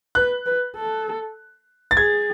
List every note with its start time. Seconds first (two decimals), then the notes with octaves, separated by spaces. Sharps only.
0.15 B4 F#6
0.46 B4
0.76 A4
1.91 A6
1.97 G#4 G#6